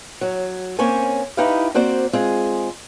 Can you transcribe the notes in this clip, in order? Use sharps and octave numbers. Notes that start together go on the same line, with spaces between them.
F#3
A#3 C4 C#4 C5 C#5 G#5
D#4 E4 G4 B4 D#5 F5
A#3 C4 F#4 C5 D5
G#3 C4 F4 G#4